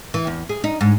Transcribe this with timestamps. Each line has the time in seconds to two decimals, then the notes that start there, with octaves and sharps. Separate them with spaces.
0.14 E3
0.27 E2
0.49 G#4
0.64 D#4
0.81 G#2